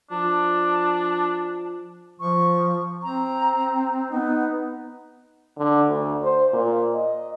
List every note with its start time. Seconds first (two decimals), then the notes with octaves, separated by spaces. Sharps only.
0.11 F3 D4 A5
2.20 F3 C#6
3.03 C4 A#5
4.11 B3 D#4
5.58 D3
5.87 D2
6.23 C5
6.53 A#2
6.94 D#5